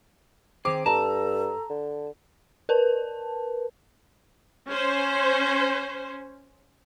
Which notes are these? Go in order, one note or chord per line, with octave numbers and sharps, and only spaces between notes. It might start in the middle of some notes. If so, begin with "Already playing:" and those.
D#3 C4 G#4 D6
G2 A4 A5 A#5
D3
A#4 B4 A5
C#4 C5